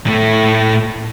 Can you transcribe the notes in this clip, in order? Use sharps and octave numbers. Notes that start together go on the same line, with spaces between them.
A2 A3